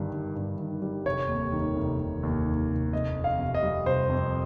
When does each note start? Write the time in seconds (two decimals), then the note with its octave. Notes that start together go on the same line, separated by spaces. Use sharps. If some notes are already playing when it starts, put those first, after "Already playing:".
Already playing: G1 G2 D#3 G3
0.11 G1
0.36 G2
0.59 D#3
0.82 G3
1.05 F1 C#5
1.29 D#2
1.52 D#3
1.76 F1
1.99 F1
2.23 D#2
2.45 D#3
2.70 F1
2.93 F1 D#5
3.16 F2
3.24 F5
3.39 C3
3.54 D#5
3.63 G3
3.86 F1 C5
4.09 F2